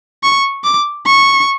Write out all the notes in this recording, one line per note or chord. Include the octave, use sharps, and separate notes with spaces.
C#6
D6
C#6